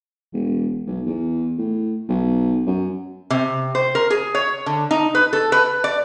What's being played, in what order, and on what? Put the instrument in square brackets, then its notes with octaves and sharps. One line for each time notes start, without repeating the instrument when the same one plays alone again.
[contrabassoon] E1
B1
E2
A2
B1
F#2
[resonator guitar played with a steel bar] C3
C5
A#4
G#4
C#5
D3
D#4
B4
A4
B4
D5